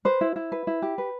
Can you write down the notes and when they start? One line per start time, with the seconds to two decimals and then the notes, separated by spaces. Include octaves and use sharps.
0.05 B4 C5
0.21 E4
0.36 E4
0.52 B4
0.67 E4
0.82 G4
0.98 B4